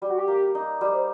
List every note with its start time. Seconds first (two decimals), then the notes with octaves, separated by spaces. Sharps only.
0.01 G3 G4
0.10 F#4
0.18 G4
0.28 A#3
0.55 D#4
0.81 G3
0.92 C5